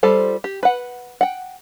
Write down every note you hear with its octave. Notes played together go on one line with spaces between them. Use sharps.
G3 F4 A4 C5
G4
B4 F#5
F#5 G5